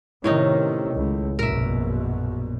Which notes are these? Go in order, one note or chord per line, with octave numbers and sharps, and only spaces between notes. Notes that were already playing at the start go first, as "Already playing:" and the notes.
A2 C3 D#3 C#4 D#4
C#2
A#1 F#2 B2 A#4 E5